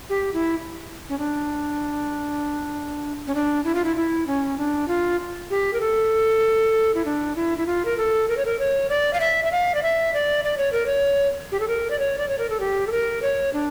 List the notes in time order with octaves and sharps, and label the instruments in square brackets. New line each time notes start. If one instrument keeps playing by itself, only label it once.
[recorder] G4
E4
C#4
D4
C#4
D4
E4
F4
E4
E4
C#4
D4
F4
G4
A#4
A4
E4
D4
E4
E4
F4
A#4
A4
A#4
C#5
A#4
C#5
D5
F5
E5
E5
F5
D5
E5
D5
D5
C#5
A#4
C#5
G4
A4
A#4
D5
C#5
D5
C#5
A#4
A4
G4
A4
A#4
C#5
D4